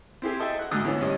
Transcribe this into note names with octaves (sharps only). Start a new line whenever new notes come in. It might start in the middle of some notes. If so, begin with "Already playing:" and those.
C4 E4 G4 G#4
A4 D#5 E5 G5 A5
F#5 F#6
D2 G#2 D3 D#6 F#6
E2 D3 E3 B3 C#4
G2 C#4 D#5